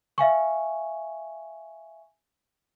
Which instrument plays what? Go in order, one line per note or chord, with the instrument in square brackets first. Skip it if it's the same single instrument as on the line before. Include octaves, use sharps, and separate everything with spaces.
[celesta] E5 F5 G#5 C#6